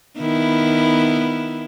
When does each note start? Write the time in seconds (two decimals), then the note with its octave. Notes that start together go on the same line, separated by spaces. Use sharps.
0.18 D#3 B3 E4